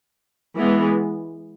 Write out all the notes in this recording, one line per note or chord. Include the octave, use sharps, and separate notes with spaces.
E3 G#3 B3